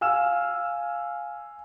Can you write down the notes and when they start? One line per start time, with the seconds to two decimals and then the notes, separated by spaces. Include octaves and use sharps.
0.01 F5 G#5 E6 F6 E7